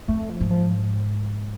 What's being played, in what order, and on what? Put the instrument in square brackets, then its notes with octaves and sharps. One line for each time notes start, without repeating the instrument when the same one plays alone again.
[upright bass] F2 [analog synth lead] A3
[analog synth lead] F3
[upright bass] G#2
[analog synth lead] F3